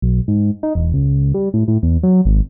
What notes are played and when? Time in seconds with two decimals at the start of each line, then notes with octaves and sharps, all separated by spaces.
0.02 B1
0.28 G#2
0.63 D#4
0.75 E1
0.94 C#2
1.34 G3
1.54 A2
1.68 A2
1.83 E2
2.03 F#3
2.25 G#1